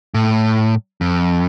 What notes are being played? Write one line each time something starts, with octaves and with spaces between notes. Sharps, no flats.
A2
F2